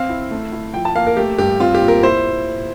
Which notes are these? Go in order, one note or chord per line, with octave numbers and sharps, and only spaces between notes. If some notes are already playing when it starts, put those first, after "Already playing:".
Already playing: C4 F5
E4
A3
E4
F3 G5
A5
A#3 F5
A#4
A3 G4
G2 G4
C4 F4
G4
A#2
A#4
E4 C5